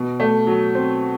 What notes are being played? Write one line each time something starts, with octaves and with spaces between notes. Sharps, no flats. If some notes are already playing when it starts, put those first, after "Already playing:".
Already playing: B2
A3
F#3
C4